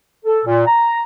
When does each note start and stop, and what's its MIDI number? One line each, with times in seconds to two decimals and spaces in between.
0.25 0.40 69
0.45 0.64 46
0.66 1.01 82